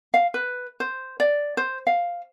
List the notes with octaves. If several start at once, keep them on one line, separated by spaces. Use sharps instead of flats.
F5
B4
C5
D5
C5
F5